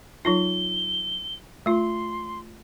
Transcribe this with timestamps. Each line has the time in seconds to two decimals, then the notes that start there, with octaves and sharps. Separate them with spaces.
0.25 F#3 D#4 F4 G7
1.66 A3 F4 C6